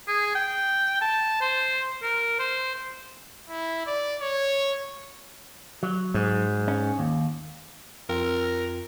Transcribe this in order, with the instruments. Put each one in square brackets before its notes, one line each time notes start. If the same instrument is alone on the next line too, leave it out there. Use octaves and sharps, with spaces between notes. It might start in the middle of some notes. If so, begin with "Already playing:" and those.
[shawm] G#4
G5
A5
C5
A#4
C5
[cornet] E4
D5
C#5
[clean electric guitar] F#3
[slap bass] G#2
[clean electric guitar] C#4
D#2
[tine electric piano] F2 F4 G5 [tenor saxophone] A#4